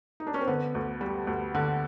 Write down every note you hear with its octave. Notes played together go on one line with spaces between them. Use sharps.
D#4
D4
C#4
C4
D3 B3
D2
G3
D2
D3